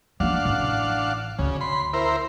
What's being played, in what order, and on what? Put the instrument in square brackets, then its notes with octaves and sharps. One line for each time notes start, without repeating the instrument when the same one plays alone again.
[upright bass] F3 A#3 [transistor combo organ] D4 F5 F#5
[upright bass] A1
[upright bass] D2 [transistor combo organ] C#3
[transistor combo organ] B5 C6
E4 A#4 C5